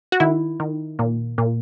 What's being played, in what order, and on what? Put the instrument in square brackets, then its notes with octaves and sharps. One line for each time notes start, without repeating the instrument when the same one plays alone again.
[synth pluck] F#4
D#3 E4
D#3
A#2
A#2